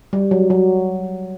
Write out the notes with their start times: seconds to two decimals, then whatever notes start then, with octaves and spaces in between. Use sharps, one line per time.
0.13 G3
0.31 F#3
0.50 F#3